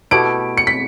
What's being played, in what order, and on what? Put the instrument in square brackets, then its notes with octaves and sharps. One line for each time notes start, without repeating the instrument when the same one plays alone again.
[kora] B2 A3 E4 G4 [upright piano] D7
[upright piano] C#7
B6